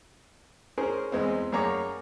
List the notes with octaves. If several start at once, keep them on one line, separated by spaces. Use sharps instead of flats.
C#4 G#4 A#4 C5
E2 G#3 B3 C4
F#2 A#3 G#4 C#5 A#5 D6